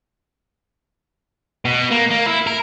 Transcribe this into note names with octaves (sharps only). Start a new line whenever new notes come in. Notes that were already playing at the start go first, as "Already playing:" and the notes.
B2
A#3
A#3
E4
A#4